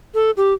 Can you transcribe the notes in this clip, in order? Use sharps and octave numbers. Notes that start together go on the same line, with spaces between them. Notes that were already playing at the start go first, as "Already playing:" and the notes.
A4
G4